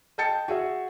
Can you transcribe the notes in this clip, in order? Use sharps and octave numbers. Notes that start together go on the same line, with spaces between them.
D#5 G5 A5 G6 A6 C#7
F#4 G#4 E5